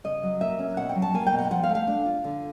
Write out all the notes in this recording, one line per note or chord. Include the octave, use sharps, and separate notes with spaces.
C#3 D#5
F#3
A#3 E5
C#4
B2 F#5
G5
F#3
A5
A#3 G#5
G5
B2
F#5
F3 F#5
F5
A3
F5
D4
F4
D3